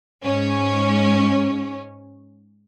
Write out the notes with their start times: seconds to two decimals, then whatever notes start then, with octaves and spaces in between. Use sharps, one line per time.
0.23 G#2 C#4